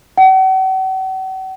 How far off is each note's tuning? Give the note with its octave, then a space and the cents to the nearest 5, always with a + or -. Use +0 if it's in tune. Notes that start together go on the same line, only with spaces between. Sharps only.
F#5 +45